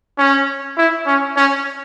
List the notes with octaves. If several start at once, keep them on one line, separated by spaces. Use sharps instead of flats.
C#4
E4
C#4
C#4